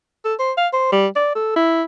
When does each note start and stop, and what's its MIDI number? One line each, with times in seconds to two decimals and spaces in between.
0.25 0.34 69
0.39 0.52 72
0.57 0.68 77
0.73 0.88 72
0.92 1.07 55
1.16 1.30 74
1.35 1.52 69
1.56 1.83 64